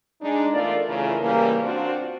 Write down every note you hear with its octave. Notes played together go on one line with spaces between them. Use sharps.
G#3 D4 D#4
E2 A3 F4 A#4 D5
A2 C#3 E3 F4 A4 A#4
C#3 E3 G3 A#3
C4 D4 F4 F#4 C5